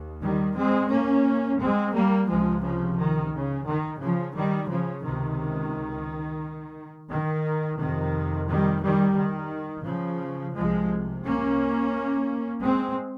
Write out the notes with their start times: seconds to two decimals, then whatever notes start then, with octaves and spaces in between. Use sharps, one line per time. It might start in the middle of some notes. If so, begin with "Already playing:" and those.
Already playing: D#2
0.21 D#3 G3
0.55 G#3 C4
0.90 A#3 C#4
1.59 G#3 C4
1.94 G3 A#3
2.28 C#2 C3 F3 G#3
2.63 C#3 F3
2.97 D#3
3.32 C#3
3.66 D#3
4.01 C#3 F3
4.35 D#3 G3
4.70 C#3 F3
5.04 C#2 C3 D#3
7.11 D#3
7.79 F2 C3 D#3
8.48 D#3 G3
8.83 D#3 G3
9.17 D#3
9.86 C#3 F3
10.55 C2 C3 F3 G#3
11.24 A#3 C#4
12.63 G#3 C4